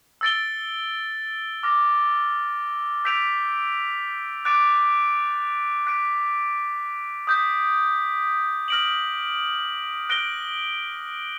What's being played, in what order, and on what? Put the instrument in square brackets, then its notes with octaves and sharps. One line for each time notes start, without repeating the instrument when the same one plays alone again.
[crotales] E6 A6 D7 G7
D6 F6 A#6
E6 G6 B6 D7 F7
D6 F#6 A6 D7
F#6 B6 D7
D#6 G6 B6
F6 A#6 D7 F#7
F#6 A#6 D7 G7